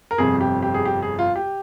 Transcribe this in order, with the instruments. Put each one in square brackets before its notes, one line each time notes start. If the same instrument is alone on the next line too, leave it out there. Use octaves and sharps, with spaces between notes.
[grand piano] A#4
G1 F2 C3 G#4
G4
G4
G#4
G4
G#4
F4
G4